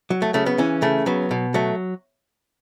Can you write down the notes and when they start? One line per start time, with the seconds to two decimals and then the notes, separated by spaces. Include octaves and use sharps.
0.10 F#3
0.22 A3
0.34 C#3 A3
0.46 B3
0.58 E3 C#4
0.82 C#3 A3
1.06 F#3 B3
1.31 B2
1.54 F#3 A3